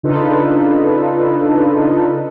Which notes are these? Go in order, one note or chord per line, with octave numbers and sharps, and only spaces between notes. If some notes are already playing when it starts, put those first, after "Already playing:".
C#3 D4 D#4 F4 A4 B4